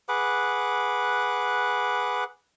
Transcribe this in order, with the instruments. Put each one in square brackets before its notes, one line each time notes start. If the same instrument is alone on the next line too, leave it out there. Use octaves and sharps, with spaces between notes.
[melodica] G#4 B4 F#5 D6